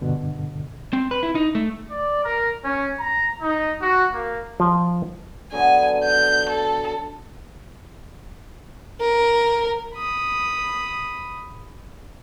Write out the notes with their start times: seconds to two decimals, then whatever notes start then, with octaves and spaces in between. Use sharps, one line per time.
0.01 G2 B2 D3
0.93 C4
1.11 B4
1.23 E4
1.35 D#4
1.55 A3
1.89 D5
2.25 A#4
2.65 C#4
2.98 A#5
3.41 D#4
3.80 F#4
4.14 A#3
4.60 F3
5.52 D3 F#3 B3 G#5
6.04 G6
6.49 A4
9.00 A#4
9.95 B5 D#6